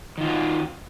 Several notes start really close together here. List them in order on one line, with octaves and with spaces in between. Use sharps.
D#3 F4 F#4